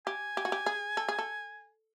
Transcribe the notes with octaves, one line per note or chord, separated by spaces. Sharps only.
G4 G#5
G4
F#4
G4
G#4
A4
G#4
A4